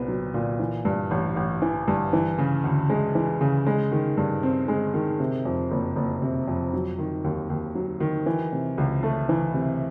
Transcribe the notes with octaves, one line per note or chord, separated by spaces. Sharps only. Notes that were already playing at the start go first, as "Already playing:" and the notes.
Already playing: C2 A#2 B3
F#3
A#2
E3
G2
A1
A1
E3
G2
E3
C#3
D2
G#3
E3
C#3
G#3
D#3
G2
C4
G#3
D#3
C3
F2
F#1
F#1
C3
F2
F#3
D#3
D#2
D#2
F#3
D#3
E3
C3
C#2
A3
E3
C3